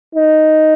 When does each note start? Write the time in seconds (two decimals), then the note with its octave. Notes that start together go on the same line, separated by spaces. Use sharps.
0.15 D#4